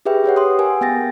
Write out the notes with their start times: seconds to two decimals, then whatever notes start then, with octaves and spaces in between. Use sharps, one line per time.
0.06 G4 G#4 B4 E5 G5
0.24 G4 B4 C#5 F#5
0.36 C6 D#6
0.59 A#4 G#5
0.81 B3 G5 A6 A#6